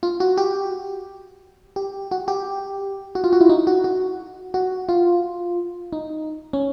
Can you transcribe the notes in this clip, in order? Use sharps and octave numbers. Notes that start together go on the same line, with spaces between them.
F4
F#4
G4
G4
F#4
G4
F#4
F4
F#4
E4
D#4
F#4
F#4
F#4
F4
D#4
C#4